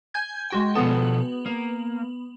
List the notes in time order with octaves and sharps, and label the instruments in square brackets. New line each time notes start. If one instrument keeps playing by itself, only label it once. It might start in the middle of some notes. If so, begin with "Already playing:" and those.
[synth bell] G#5 G6 G#6
G#3 F#4 G5
[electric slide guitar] B2 F3 A4 [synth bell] B3
[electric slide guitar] A#3